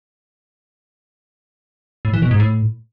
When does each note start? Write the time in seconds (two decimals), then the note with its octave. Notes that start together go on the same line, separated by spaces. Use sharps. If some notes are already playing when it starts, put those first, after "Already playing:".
2.05 A2
2.13 E3
2.22 B2
2.31 G#2
2.40 A2